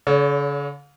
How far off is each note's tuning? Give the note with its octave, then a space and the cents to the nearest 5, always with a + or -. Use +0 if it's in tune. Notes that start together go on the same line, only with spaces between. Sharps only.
D3 -45 C#5 +25